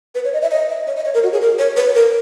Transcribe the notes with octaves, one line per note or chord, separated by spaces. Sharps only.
B4
C#5
D#5
E5
D#5
E5
C#5
D#5
C#5
A#4
F#4
G#4
A#4
C#5
B4
A#4